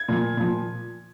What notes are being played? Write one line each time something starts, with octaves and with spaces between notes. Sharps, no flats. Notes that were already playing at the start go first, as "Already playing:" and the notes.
Already playing: G#6
A#2 F3
A#2 F3